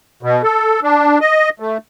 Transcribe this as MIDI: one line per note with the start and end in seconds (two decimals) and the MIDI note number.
0.23 0.42 47
0.43 0.80 69
0.83 1.19 62
1.21 1.49 75
1.60 1.77 57